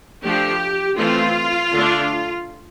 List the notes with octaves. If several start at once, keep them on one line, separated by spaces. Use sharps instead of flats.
F3 A3 D4 G4
E3 A3 C4 F4
D3 A3 D4